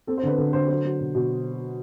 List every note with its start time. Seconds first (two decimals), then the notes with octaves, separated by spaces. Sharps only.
0.07 C4 A4
0.18 C5
0.23 D3 B4
0.38 D3 A4
0.53 D3 C5
0.69 F#3 C5
0.85 F#3
1.00 B2
1.15 B2